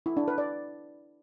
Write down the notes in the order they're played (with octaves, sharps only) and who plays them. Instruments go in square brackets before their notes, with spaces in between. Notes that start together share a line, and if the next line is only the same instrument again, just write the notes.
[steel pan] E4
D4
B4
D5